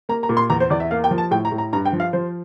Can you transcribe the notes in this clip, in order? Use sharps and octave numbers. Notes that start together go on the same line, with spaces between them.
A#3 A#5
A#5
A#2
C6
E2 A#5
C5
E2 D5
E5
A#3 F5
G5
F3
A5
A2 G5
A#5
A2
A#5
G2 A#5
G5
F3
F5
F3 C5